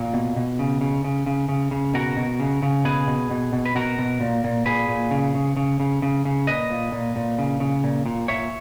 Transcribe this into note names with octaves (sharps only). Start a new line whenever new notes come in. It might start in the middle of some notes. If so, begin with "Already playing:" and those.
Already playing: A#2
B2
B2
C#3
C#3
C#3
C#3
C#3
C#3
B2 F#4 A#4
B2
C#3
C#3
B2 G#4 B4
B2
B2
B2
B4
B2 F#4 A#4
B2
A#2
A#2
A#2 G#4 B4
A#2
C#3
C#3
C#3
C#3
C#3
C#3
A#2 B4 D#5
A#2
A#2
A#2
C#3
C#3
A#2
A#2
A#2 C#5 E5